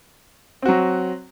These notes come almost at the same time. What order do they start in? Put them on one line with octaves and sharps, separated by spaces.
C4 F#4 F#3